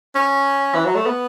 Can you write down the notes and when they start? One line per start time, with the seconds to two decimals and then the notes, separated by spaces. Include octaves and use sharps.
0.15 C#4
0.74 E3
0.85 F#3
0.95 A3
1.06 B3